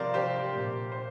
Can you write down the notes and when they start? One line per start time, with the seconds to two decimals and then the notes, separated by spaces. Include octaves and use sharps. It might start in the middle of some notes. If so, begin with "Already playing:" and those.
Already playing: C3 F3 C4 A#4 C5 D5 F5
0.14 G4 C5
0.56 A#2 A#3
0.92 C5